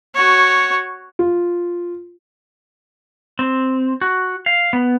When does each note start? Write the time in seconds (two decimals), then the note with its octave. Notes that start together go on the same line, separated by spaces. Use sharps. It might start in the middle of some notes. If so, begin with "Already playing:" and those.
0.14 F#4 C#5
1.19 F4
3.39 C4
4.01 F#4
4.46 F5
4.73 B3